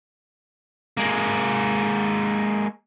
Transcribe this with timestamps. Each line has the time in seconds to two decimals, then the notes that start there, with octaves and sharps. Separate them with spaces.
0.97 G#3 A#3